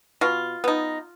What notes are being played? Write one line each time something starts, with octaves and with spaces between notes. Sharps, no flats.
B2 F4
B3 D#4